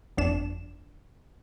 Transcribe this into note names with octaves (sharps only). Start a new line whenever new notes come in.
G1 F2 D4 E7